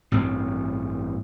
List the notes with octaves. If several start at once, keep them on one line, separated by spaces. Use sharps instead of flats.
A1 G2 C4